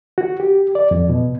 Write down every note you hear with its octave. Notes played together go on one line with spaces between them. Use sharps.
F#4
G4
D5
F2
B2